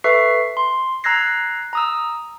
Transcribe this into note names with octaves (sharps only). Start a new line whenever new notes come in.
A4 B4 E5 C#6 C7
C6
A#5 E6 F#6 G#6 A#6 C7
A#5 D#6 E6